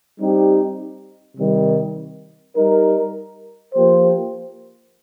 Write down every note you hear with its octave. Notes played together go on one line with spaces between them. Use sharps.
G3 C4 D#4 G4
C3 D#3 G3
G3 D#4 A#4
F3 A#3 G4 C5